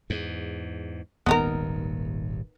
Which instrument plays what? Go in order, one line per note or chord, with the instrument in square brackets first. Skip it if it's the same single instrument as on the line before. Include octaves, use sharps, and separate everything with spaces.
[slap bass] E2 G#2
[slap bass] D#1 G#1 D#2 [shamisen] B3 D#4 A#4